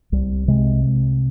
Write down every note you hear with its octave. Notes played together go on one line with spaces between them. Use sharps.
C2 G3
C3 G#3